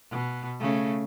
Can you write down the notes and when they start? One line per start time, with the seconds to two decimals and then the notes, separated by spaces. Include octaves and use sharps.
0.11 B2
0.60 C#3 A3